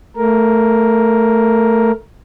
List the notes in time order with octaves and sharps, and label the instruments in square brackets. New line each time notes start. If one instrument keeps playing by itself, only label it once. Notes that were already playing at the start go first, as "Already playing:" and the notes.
[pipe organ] A3 A#4